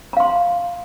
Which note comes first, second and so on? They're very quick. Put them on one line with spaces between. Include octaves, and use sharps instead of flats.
A#5 F5 C6